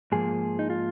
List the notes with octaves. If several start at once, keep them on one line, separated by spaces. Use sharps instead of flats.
G#2 F3 A#3 G#4
D#4
F4